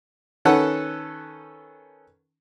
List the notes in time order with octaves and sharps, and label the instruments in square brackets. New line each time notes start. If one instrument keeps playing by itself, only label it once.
[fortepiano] D#3 C#4 A4 B4 F#5